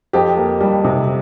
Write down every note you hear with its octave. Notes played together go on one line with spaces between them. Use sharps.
F2 G4
A#3
G3
C3